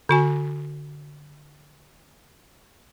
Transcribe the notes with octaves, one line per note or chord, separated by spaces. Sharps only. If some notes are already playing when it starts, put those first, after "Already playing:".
D3 F#4 G#5